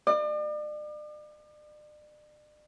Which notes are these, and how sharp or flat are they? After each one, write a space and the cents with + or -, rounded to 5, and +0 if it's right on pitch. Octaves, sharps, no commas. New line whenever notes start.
D5 +40